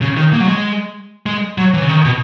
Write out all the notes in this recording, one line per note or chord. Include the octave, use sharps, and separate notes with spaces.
C#3
D#3
A#3
F#3
G#3
G#3
F#3
E3
C#3
D#3
B2